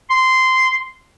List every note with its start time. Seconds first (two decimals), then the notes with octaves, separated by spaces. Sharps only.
0.10 C6